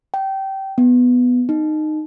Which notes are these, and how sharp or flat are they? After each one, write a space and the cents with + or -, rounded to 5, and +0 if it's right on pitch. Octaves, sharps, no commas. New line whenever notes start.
G5 -20
B3 +5
D#4 -15